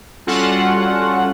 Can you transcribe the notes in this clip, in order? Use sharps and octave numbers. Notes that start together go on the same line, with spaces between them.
G3 C#4 F4 F#4 A4 F#5